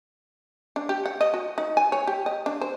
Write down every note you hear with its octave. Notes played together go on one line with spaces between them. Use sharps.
D4
G4
F#5
D#5
F#4
D#4
G#5
C#5
G4
D#5
D4
C5